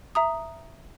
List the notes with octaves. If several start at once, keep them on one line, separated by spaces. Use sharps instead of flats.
E5 A#5 D#6